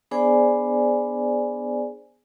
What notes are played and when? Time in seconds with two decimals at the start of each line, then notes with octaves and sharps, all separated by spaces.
0.11 B3 D4 G#4 C5 D5 G#5